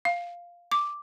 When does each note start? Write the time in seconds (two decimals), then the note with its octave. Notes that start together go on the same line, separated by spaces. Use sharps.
0.05 F5
0.72 D6